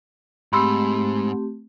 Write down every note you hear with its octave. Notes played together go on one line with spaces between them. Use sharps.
G#2 A3 C4 G4 B5 C6 E6